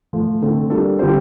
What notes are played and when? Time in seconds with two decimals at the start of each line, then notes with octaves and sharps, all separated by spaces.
0.13 A2 F3 A3
0.42 D3 A3 C4
0.70 G3 A#3 D4 A4
0.99 D3 G3 C4 G4 C5